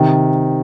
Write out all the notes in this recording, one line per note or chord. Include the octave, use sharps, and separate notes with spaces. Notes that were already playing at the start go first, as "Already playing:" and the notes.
Already playing: C3 D#3